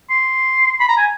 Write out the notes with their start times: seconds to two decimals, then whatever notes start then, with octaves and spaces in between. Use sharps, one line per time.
0.10 C6
0.80 B5
0.89 A#5
0.97 G#5